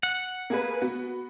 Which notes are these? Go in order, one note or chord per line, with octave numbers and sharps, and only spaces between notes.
F#5
A#3 G#4 B4
B3 F#4